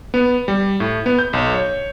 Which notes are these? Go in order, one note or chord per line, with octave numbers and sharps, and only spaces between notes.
B3
G3
A2
B3
G6
B1
C#5